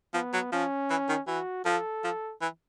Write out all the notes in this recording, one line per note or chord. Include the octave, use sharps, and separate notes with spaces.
F3 B3
F#3
F3 C#4
E3
D#3
E3 F#4
F3 A4
F3
E3